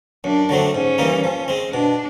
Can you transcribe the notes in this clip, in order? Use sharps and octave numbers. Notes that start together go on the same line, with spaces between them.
F#2 D4
D3 F#3 A3 C4
G#2 C#4
E3 G3 A#3 D#4
F3
G#3 C4
B2 D4